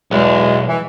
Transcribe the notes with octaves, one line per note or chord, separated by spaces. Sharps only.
B1 E2 B2 G#3
E3